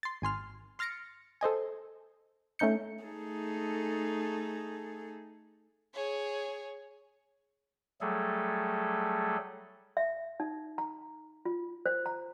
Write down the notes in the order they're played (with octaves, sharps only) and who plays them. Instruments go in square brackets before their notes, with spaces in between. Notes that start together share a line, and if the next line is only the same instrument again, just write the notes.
[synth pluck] C6 A6
G#1 G#5 C6 F6
C6 F6 A6 A#6 C#7 D7
A4 C5 D#5 G#5
A3 C#4 D#4 G6 C#7
[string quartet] A3 D#4 G#4 A4
[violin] G#4 C#5
[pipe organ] F#3 G3 A3 G#4 A4
[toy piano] E5
D#4
A#5
F4
C5
A#5